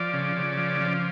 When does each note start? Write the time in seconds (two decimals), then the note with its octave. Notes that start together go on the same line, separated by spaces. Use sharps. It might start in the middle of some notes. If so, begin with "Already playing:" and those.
Already playing: F3 D5
0.13 C#3
0.36 C#3
0.57 F3
0.81 F3